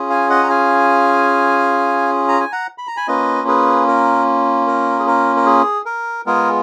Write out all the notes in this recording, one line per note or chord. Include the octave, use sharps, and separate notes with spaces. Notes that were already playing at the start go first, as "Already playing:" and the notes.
Already playing: C#4 F4 G#4
F5 G#5
D#5 F#5
A#5
F5 G#5
A#5
G#5
F#5 A#5
B5
A#5
G#5 B5
A#3 C#4 F4 B4 D#5
G#4 B4
A#4
A#4
G#4
A#4
A#4
G#4
A#4
G#3 B3 F4 G#4 A#4